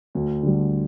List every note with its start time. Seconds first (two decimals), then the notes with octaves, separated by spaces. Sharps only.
0.15 D2
0.43 D3 G3